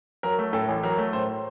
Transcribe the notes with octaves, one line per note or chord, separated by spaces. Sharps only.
F#3 A#4
A3
A2 A4
A1
F#3 A#4
A3
A2 C5